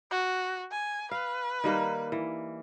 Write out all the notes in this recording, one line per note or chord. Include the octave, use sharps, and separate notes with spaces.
F#4
G#5
B4 F5
D#3 G3 A#3
E3